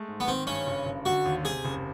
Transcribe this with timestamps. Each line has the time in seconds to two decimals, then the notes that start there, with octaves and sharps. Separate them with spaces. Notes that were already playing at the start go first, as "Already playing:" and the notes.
Already playing: G#3 A3
0.08 G#2
0.20 B3
0.28 D#3 C4
0.47 G2 C#4
0.67 F#1
0.86 F#1
1.05 D3 F#4
1.26 D#2
1.45 C3 G#4
1.65 F#1